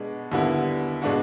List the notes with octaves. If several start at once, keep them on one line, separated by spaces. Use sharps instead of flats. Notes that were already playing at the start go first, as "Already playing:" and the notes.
Already playing: B2 G#3 B3 D4
D#2 D3 G3 B3 E4
B2 G#3 B3 D4 F#4